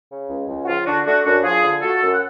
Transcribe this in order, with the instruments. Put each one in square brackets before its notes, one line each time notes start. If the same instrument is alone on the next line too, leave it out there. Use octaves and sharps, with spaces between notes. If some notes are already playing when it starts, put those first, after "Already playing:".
[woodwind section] C#3
C#2
C#2
F#4
F3 F4
D3 D4 F#4
A3 D4 F#4
F#2 D4 F#4
F3 F4 G#4
D3
A3 F#4 A4
F#2
F#5